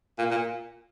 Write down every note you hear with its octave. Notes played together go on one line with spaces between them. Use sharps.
A#2
A#2